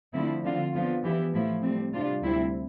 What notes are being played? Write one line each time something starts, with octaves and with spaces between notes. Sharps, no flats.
D3 F3 A3 C4 E4
D3 F3 C4 F4
D3 F3 B3 F4
E3 B3 E4 G4
A2 F3 A3 E4
A2 G3 C4
C3 G3 D4 F4
D2 C3 G3 C4 E4